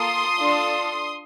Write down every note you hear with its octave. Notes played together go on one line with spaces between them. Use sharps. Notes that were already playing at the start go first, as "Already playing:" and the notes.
Already playing: A#3 F4 A4 C6 D#6
D4 F4 A4